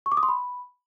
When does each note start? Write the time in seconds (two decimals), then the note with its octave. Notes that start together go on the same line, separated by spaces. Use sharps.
0.06 C#6
0.12 D6
0.17 D#6
0.23 C6
0.28 B5